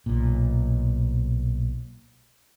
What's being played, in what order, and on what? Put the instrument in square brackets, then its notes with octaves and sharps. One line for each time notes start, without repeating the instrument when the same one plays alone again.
[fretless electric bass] B1 A#2